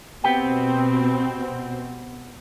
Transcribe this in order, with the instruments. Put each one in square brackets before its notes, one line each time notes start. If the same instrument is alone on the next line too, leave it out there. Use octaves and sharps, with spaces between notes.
[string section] B2 C4 [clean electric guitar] B3 G4 G5